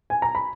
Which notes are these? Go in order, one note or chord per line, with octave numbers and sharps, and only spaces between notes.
G#5
A#5
B5